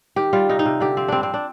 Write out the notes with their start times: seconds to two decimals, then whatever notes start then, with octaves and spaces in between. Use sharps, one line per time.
0.16 D#3 G4
0.33 G3 F4
0.49 C3 D#4
0.59 D#4
0.66 C3
0.80 D3 G4
0.97 F3 C4
1.08 G2 C4 D4
1.23 C4
1.34 D4